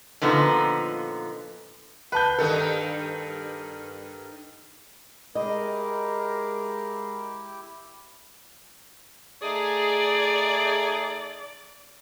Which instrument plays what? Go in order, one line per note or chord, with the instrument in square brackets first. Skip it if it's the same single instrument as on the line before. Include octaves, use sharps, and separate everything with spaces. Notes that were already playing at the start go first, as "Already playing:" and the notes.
[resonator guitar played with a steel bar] A#2 D3 F3 B3 D#4
[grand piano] B4 G6 [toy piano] F#5 A5
[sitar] G2 D#3 A4 [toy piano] A#4
[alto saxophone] G#3 [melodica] E4 G4 [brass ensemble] A#4 [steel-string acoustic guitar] D#5
[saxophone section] A3 D#4 G#4 [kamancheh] D5